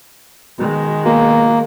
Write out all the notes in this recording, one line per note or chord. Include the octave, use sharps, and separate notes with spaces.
B2 D#3 G#3
B2 A#3